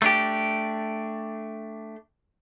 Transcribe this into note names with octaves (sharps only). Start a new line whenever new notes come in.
A3 D4 G4